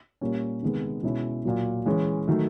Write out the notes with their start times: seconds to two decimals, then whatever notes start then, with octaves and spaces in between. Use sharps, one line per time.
0.21 A#2 G3 A#3 C#4
0.63 C3 D#3 G#3 B3
1.03 B2 G#3 C#4 E4
1.45 A#2 F#3 A#3
1.86 E3 G#3 C#4
2.28 D#3 F#3 A3